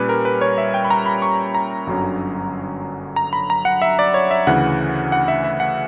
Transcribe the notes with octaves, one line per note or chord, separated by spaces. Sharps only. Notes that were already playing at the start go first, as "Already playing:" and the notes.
Already playing: A#2 G3 C#4 B4
A#4
B4
C#5
E5
G5
B5
A#5
B5
C#6
A#5
G1 F#2 D3 F#3 C#4
A#5
B5
A#5
F#5
E5
D5
C#5
E5
D2 C#3 E3 F#5
F#5
E5
E5
F#5